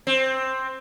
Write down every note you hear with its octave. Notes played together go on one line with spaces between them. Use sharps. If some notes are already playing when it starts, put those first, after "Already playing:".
C4